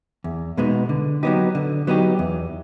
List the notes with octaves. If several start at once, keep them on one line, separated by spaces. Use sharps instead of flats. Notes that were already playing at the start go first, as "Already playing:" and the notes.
E2
B2 G#3 B3 D#4
D3
F#3 B3 D#4 G4
D3
F#3 B3 D#4 G4
E2